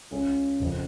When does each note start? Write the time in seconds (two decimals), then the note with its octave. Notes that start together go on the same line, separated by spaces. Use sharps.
0.11 C#2 C#3 G#3 C#4
0.59 F#1 F2 F3